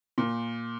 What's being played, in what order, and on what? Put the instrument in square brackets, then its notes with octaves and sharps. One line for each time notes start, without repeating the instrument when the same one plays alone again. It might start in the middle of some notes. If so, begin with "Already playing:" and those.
[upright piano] A#2